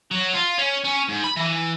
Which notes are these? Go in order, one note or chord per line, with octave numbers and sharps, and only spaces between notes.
F#3
F4
C#4
C#4
G#2
B5
E3